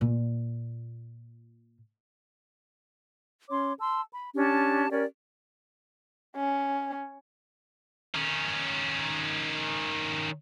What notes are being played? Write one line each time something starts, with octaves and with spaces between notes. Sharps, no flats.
A#2 F4
C#4 C#5 C6 D6
A5 C6 E6
B5
C#4 D4 G4 A5
C#4 G4 A#4 D5
C#4
D#3 C#4